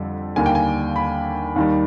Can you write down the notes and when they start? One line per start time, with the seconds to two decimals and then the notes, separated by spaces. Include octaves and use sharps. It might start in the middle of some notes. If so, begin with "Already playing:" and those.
Already playing: F2 D3 G3
0.36 D#2 D3 G3 A#3 G#5
0.46 G5
0.55 G#5
0.96 B5
1.56 D#2 D#3 G3